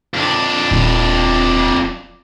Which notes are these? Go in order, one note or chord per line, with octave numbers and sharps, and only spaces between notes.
F2 D4
D#1